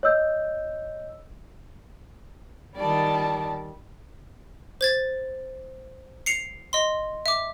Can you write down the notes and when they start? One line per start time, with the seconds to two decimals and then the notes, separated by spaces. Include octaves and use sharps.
0.03 C#5 D#5 E6 G6
2.77 D#3 G3 D5 A5
4.81 C5 G#6 A6
6.26 C7 C#7 F7
6.73 D#5 C6
7.26 E5 D6